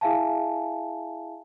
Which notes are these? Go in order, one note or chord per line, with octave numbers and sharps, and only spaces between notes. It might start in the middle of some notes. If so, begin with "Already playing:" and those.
E4 G#4 E5 F5 G#5 A5